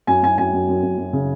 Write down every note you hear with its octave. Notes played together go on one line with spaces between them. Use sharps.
F#2 G#5
F#2 G#5
F#2 G#5
F#2
F#2
F#2
F#2
C#3